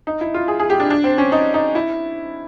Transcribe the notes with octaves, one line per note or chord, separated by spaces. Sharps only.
D#4
E4
F4
G#4
G#4
G4
D4
D4
C4
C#4
D#4
D#4
E4